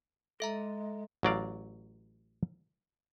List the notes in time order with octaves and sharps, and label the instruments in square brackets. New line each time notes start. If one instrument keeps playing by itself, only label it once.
[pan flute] G#3 [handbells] A4 E5 A#5
[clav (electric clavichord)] A1 F#3 D5 F5